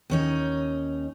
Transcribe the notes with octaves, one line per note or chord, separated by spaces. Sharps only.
D#2 C#4 D#4